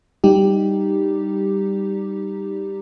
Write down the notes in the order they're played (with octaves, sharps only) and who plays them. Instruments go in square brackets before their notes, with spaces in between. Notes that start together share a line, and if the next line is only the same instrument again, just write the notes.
[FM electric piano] G3 D#4 G4